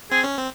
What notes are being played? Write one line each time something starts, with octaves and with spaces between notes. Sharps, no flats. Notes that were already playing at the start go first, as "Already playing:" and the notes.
C4 G#4
C#4
C4